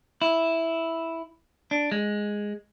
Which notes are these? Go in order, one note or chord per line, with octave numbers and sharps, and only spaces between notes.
E4
D4
G#3